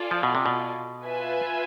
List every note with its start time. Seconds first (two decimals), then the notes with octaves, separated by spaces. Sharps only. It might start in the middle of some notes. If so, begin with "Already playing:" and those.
Already playing: F4 A4 D5 G#5
0.11 F3
0.23 B2
0.35 C3
0.46 B2
1.05 F4 B4 E5 G#5